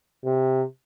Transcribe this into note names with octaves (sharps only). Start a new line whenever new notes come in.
C3